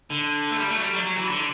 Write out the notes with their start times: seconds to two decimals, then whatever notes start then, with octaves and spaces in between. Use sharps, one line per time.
0.10 D3
0.50 A3
0.58 G3
0.70 A3
0.76 F#3
0.81 G3
0.93 F#3
1.05 F#3
1.17 E3
1.29 D3